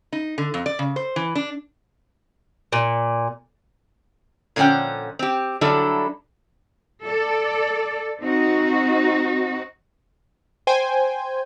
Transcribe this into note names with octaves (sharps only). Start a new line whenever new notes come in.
D#4
D3
F2
D5
C#3
C5
E3
D4
A#2
A#2 D3 F3 C#4 F#5 G5
C4 G4
D3 F#3 G3 D4 E4 A4
A4 D5
C4 D#4 F#4
C5 G5 G#5